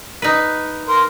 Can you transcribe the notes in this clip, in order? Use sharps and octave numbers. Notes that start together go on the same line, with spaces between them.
D#4 B4
A#4 C6